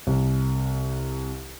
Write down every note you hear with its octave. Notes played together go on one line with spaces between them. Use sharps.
C2